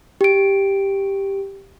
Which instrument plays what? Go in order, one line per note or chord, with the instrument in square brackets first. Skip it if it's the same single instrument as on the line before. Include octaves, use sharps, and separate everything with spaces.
[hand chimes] G4 D7